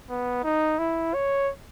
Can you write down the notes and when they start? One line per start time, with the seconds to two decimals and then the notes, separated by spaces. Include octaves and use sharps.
0.10 B3
0.44 D#4
0.79 E4
1.14 C#5